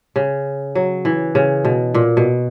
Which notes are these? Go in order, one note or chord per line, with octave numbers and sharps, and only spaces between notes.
C#3
F#3
E3
C#3
B2
A#2
B2